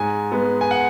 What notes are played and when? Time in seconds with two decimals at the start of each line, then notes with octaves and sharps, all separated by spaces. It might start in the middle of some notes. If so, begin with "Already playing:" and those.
Already playing: G#2 G#5
0.32 G#3 B3
0.61 G#5
0.71 F#5